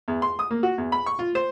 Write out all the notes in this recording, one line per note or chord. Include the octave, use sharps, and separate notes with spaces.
E2
C6
D#6
A#3
F#4
E2
B5
C#6
F4
C5